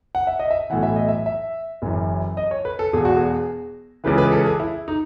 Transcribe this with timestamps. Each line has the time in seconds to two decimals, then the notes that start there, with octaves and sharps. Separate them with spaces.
0.15 F#5
0.27 E5
0.39 D#5
0.51 E5
0.70 B1 A2 E3 F#5
0.83 E5
0.96 D#5
1.08 E5
1.26 E5
1.82 F#1 F#2 E3
2.37 D#5
2.51 C#5
2.65 B4
2.79 A4
2.93 E1 E2 B2 G#4
3.05 F#4
3.16 G#4
4.04 C#2 C#3 E3 B4
4.18 B4
4.32 A4
4.46 G#4
4.60 E4
4.88 D#4